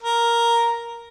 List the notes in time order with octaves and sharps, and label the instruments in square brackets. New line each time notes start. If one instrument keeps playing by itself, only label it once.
[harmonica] A#4